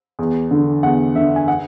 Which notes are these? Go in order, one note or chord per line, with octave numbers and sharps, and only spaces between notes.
E2
D3
E2 F#5
D3 E5
G#5
F#5